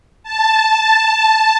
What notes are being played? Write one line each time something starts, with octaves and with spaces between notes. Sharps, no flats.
A5